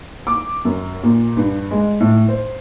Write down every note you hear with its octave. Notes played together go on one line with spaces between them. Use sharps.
D6
F#2
A#2
G2
G#3
A2
C5